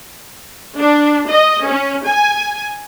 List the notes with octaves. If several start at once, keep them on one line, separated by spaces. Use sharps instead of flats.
D4
D#5
C#4
G#5